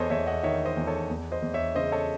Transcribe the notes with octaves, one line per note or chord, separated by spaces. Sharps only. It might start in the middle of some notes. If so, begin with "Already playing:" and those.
Already playing: E2 A4 C5 C#5 D#5
E2 C#5 E5
D#5 F#5
D#3 C#5 E5
C5 D#5
E2
A4 C#5
E2
C5 D#5
E2
C#5 E5
C#3 C5 D#5
A4 C#5